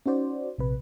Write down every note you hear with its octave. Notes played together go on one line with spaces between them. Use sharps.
C#4 D#4 F#4 C5 D5
A#1 C3 B4